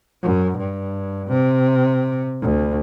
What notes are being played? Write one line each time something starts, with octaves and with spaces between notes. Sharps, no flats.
F#2
G2
C3
D2